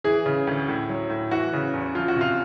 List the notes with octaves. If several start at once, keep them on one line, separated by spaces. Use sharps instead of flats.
E3 G#4
C#3
D2
A2
F#3
A2
E3 F#4
C#3
E2
F3 F4
F#4
C3 F4